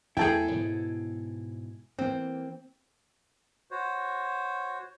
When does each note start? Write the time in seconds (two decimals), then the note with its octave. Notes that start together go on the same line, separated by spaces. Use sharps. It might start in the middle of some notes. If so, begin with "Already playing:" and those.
0.17 E2 A3 E4 G#4 A4 G5
0.51 G#2 B2
1.99 E3 A#3 C4
3.71 F#4 C5 C#5